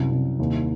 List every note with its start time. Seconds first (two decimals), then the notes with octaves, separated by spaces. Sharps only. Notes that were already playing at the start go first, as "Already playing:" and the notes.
Already playing: C2 F#2
0.11 C2
0.39 D#2